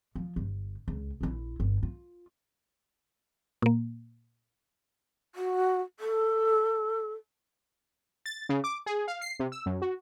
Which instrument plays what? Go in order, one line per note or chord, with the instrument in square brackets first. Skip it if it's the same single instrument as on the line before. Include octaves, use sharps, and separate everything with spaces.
[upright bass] F3
G1
C#2
A#1 E4
G1
F4
[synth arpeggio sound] A#2 A#3
[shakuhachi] F#4
A4
[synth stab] A6
C#3
D6
G#4
F5
C7
C3
E6
F#2
F#4